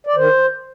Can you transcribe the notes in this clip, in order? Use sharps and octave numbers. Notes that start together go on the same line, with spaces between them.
D5
D#3 C5